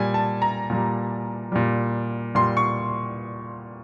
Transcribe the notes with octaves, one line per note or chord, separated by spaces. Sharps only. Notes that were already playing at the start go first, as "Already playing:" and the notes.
Already playing: A#2 G3 G#5
A5
A#5
A#2 G3
A#2 G3
A#2 G3 C6
C#6